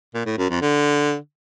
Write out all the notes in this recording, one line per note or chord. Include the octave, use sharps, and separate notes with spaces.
A#2
A2
F#2
F2
D3